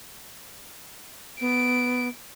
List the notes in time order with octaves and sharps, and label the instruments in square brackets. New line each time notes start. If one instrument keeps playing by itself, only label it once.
[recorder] B3 [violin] D7